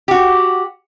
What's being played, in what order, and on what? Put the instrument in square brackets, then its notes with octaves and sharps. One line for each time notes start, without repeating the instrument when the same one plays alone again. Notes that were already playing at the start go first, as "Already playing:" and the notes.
[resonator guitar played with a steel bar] F#4 G4